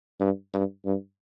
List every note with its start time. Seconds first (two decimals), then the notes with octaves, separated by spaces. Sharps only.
0.20 G2
0.54 G2
0.85 G2